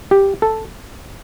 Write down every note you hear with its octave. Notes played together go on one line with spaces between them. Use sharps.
G4
A4